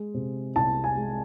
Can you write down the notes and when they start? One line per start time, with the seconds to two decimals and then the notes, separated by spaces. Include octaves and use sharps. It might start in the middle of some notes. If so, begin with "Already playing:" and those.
Already playing: G#3
0.14 C3
0.56 C2 A5
0.84 G#5
0.97 G#3